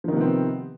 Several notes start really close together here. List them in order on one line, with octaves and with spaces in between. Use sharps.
F3 D#3 C3 B3 C4